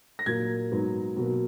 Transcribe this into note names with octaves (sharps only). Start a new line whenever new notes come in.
A#6
A#2 F#3 A#3 G#6
G#2 F#3 B3
B2 F#3 A#3